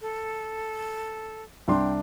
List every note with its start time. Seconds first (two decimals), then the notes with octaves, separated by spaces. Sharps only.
0.01 A4
1.68 C2 D4 G5 C6